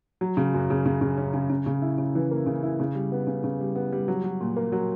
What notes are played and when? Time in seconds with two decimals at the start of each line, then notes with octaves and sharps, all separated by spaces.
0.21 F#3
0.37 C#3
0.54 F#2
0.70 C#3
0.86 C#3
1.01 C#3
1.18 C#4
1.34 C#3
1.50 C#3
1.66 C#3
1.82 E4
1.98 C#3
2.15 E3
2.31 A#3
2.46 C#3
2.63 E4
2.80 C#3
2.95 G3
3.12 B3
3.27 C#3
3.44 C#3
3.60 G3
3.76 B3
3.92 G3
4.08 F#3
4.24 F#3
4.41 A#2
4.57 A#3
4.72 F#3